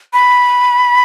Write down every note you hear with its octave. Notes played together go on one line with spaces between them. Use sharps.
B5